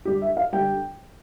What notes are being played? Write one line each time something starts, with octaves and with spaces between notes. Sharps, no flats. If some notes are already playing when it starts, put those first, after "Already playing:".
D3 G3 G4
E5
F5
D3 G3 G5